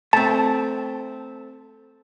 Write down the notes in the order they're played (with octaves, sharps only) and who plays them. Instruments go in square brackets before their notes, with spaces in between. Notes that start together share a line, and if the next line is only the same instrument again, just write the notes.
[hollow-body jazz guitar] A3 C4 [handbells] A5